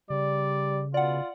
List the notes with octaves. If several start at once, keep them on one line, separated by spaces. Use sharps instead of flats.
C#3 G3 D5
B2 F4 D5 F#5